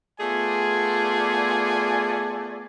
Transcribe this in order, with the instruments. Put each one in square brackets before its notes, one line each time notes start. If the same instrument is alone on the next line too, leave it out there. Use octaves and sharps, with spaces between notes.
[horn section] A3 B3 F4 G#4 D5 G#5